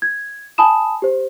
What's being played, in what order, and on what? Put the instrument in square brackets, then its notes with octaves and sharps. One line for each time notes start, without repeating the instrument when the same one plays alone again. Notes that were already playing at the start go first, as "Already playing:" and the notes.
[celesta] G#6
G#5 A5 B5 D#6 E7
G4 C5